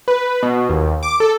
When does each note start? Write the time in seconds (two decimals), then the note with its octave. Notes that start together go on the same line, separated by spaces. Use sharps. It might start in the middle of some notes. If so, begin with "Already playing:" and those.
0.08 B4
0.43 B2
0.70 D#2
1.03 D6
1.20 A4